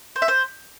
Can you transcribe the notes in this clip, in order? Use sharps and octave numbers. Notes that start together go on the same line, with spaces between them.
C5
E5
C5